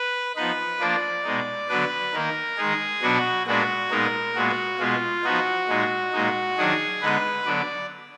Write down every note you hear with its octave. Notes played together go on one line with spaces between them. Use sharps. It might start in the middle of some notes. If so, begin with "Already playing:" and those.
Already playing: B4
F3 B3 D#4 B4
F3 A#3 D4 D5
B2 G#3 D#4
D3 F#3 B3 D4 B4
D#3 A#3 D#4 A#4
D#3 G#3 D#4 G#4
B2 F#3 B3 D4 F#4
A#2 G#3 B3 D4 F#4
A#2 G#3 B3 D#4 A#4
A#2 G#3 B3 F#4
B2 G#3 B3 F4
F3 B3 D#4 F#4
A#2 G#3 D#4
A#2 G#3 D#4
D#3 F#3 D4 G#4
D3 G#3 B3 D#4 B4
D3 F#3 B3 D4 D5